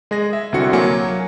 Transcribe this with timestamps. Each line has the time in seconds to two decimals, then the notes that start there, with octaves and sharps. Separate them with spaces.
0.11 G#3 G#4 A#6
0.33 E5
0.53 C2 D3 C4 F#4 C#7
0.73 F#3 A#3 G#5 C#7